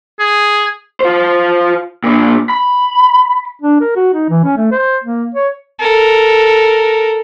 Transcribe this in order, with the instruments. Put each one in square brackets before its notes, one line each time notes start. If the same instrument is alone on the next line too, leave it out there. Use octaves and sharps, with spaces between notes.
[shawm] G#4
[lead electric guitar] F4 C5
A#2 D4
B5
[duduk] D4
A#4
F#4
D#4
E3
C#4
A3
C5
A#3
C#5
[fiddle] A4 A#4